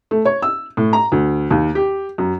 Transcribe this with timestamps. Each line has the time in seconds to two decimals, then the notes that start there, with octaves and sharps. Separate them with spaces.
0.11 A3
0.25 C#5
0.42 E6
0.77 A2
0.93 A#5
1.12 D2
1.51 D#2
1.75 G4
2.18 F#2